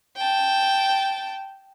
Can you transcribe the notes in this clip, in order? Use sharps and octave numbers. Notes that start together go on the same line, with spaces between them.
G5 A5